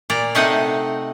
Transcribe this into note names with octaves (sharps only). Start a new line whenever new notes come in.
A#2 D5 A#5
C3 A3 C4 D#4 D#5 F#5